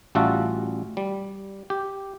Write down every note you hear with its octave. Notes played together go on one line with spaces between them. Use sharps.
A1 G3 F4 F#4 E5 A5
G3
G4